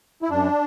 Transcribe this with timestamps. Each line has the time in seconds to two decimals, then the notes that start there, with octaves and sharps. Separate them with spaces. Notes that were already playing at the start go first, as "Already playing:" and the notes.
0.22 E4
0.30 F#2 D4